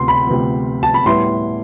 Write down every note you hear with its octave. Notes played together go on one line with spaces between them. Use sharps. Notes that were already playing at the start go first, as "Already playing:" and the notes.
Already playing: D2 C3 B3 C6
B5
D2 C3 F3 B3
A5
B5
A2 G3 B3 E4 C6